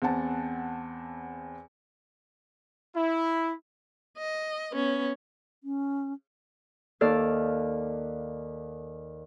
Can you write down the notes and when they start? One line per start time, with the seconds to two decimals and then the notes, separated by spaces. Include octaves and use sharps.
0.02 E2 C4 F#5 A5
2.96 E4
4.18 D#5
4.72 B3 C#4
5.64 C#4
7.01 D#2 A4 D5 F5